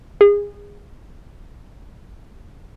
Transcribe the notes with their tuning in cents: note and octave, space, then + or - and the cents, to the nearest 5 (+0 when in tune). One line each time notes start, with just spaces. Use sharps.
G#4 -30